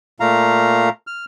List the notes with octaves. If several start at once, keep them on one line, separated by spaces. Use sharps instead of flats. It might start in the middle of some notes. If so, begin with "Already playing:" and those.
A#2 A3 F5 A#5
F6